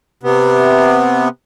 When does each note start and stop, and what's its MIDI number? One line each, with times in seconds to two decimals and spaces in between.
0.23 1.28 48
0.23 1.28 59